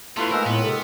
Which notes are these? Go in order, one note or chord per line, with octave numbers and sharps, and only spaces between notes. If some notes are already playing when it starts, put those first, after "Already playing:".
G3 A3 B3 E4 F4 B4 C6
D#3 G#3 A#3 A#4 C5 E6
A2 B3
C3 A4